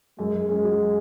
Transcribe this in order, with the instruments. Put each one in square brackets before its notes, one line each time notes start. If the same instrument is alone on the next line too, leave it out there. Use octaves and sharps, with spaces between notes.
[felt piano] F#2 [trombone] G#3
[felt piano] G#4
[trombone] G#3 [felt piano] C#4
[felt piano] F#3